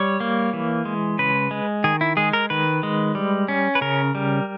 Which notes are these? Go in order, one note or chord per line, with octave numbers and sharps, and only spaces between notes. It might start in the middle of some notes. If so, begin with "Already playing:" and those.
Already playing: G3 C#5
A#3
E3
G#3
C#3 B4
G#3
D#3 G#4
E4
G#3 G#4
A#4
D#3 B4
G#3
G3
C#4
B4
C#3 A#4
G3